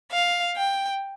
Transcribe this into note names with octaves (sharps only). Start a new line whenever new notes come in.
F5
G5